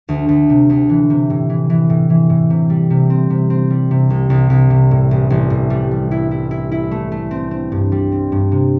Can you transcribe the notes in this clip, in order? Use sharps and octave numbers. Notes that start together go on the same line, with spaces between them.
D2
D2
C3
D2
E3
C3
A2
E3
E3
A2
E3
A2
C3
G3
C3
C4
C3
C4
G3
C3
C2
C2
C2
C3
A2
A1
A1
A2
G3
G3
E4
E4
E4
E4
A3
A3
C4
C4
G2
G3
C4
G2
C3